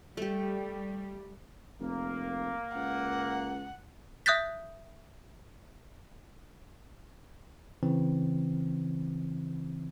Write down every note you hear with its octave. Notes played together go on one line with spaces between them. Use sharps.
G3 A3 G4
F1 A#3
C#2 F#5
E5 D#6 F#6 G6 A6 B6
C#3 E3 C4